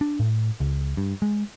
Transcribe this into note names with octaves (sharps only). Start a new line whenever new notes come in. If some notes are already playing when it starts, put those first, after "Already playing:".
D4
A2
C#2
G2
G#3